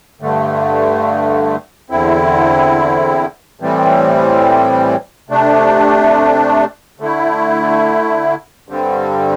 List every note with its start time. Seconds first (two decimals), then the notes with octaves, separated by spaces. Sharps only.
0.21 G2 D3 A3
1.90 E2 D3 C4 E4
3.60 A2 E3 G3 C4
5.29 C3 A3 D4
7.00 D3 A3 E4
8.68 G2 D3 G3 C4